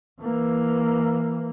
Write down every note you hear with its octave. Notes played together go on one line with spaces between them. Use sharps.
E3 A#3